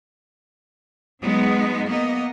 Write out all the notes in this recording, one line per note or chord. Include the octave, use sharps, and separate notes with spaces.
F#3 G#3 B3 D#4
A#3 B3 D#5